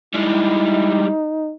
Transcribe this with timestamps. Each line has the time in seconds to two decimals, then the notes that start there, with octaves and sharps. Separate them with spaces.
0.14 G3 G#3 D#4 E4